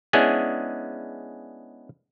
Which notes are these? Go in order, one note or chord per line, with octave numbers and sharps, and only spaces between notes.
G#3 B3 C#4 D4 E4 G#4